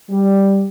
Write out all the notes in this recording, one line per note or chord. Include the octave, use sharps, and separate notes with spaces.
G3